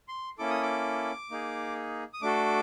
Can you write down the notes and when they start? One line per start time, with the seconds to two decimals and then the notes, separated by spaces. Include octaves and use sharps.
0.08 C6
0.38 A#3 C#4 E4 A4 D6
0.50 D#6
0.62 D6
1.31 A#3 D#4 G#4
2.14 D#6
2.21 A3 D4 F#4 A4 D6